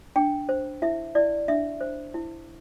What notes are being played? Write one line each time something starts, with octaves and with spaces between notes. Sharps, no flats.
D4 G5
C5
E4 E5
E4 D5
D4 E5
C5
E4